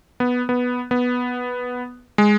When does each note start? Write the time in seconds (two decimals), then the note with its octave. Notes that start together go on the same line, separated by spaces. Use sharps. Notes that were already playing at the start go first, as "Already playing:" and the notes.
0.20 B3
0.49 B3
0.91 B3
2.18 G#3